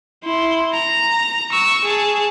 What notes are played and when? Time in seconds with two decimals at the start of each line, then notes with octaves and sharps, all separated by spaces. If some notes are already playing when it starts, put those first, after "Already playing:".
0.24 E4 C6
0.73 A#5
1.52 C#6 E6
1.85 G#4 A5